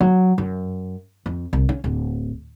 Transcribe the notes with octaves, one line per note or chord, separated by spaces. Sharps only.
F#3
F#2
F2
C2
C#4
D1